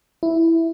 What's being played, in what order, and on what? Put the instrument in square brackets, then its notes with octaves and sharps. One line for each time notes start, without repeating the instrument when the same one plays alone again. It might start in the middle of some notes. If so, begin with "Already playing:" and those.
[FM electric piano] E4